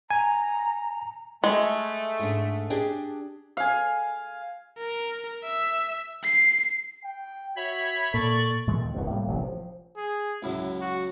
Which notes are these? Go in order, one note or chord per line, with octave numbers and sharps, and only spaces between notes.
G#5 A#5
G#3 A3
G#2 D4
D4 G4 G#4
F5 G#5
A#4
E5
C7
G5
F#4 C#5 E5 B5
A#2 A4 D5 C#6
A#2 E3 G#3 A3
D#2
D#1 C2 G2 B2
A2 G3 A#3
E1 A1 C3 F#3
C3 F3
G#4
C#2 F#2 F#3 E4
F#4